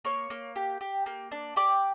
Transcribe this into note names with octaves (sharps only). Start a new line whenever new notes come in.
A#3 C#5 C#6
A#3
G4
G4
A#3
D4
G4 D5 D6